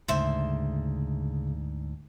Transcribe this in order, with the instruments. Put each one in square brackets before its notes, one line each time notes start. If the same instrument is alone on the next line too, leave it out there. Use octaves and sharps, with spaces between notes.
[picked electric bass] D2 G#2 [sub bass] C#3 [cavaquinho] C5 E5